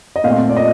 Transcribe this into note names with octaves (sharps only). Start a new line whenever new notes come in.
D#5
A#2 A3 C4 F5
D5
D#5